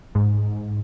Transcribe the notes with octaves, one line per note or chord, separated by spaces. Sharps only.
G#2